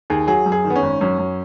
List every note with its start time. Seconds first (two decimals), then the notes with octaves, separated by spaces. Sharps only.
0.10 D#2 G#4
0.27 F#3 G#4
0.46 F#2
0.52 G#4
0.65 D#3
0.70 B3
0.76 C#4
0.82 G#1
1.01 F#2 C#4
1.18 F#2